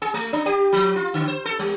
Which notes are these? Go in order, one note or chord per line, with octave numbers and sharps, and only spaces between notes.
G#4
A3
D4
G4
F3
F4
D3
C5
A4
G3